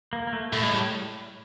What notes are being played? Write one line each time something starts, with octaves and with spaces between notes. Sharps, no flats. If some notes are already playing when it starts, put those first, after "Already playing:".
A#3
A#3
A3
A2 A3
G#3
G3